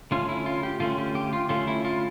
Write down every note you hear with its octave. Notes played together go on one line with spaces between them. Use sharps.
D3 A3 C#4 F4
E4
F4
G4
D3 A3 C#4 F4
G4
G4
F4
D3 A3 C#4 F4
E4
F4